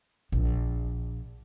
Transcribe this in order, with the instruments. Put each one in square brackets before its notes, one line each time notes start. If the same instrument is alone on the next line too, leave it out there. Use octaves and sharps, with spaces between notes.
[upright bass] A#1